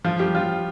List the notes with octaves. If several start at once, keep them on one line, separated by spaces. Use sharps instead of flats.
F3 F4
G3 G4
F3 F4